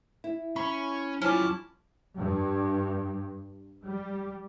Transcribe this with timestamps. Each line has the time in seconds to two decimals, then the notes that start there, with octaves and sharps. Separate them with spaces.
0.24 E4
0.56 C#4 B5 C#6
1.22 F#2 G3 C#4 E4 F4 G#5 A5 D6
2.18 G2
3.83 G3